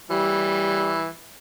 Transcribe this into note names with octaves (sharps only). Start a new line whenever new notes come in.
E3 G3